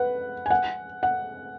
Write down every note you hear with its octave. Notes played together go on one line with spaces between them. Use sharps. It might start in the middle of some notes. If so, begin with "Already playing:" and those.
Already playing: B4 F#5
G#5
F#5
F#5